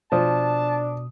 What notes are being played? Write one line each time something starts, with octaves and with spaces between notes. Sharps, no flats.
B2 F3 D4 A5 D#6